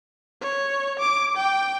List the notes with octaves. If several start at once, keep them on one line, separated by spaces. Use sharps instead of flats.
C#5
D6
G5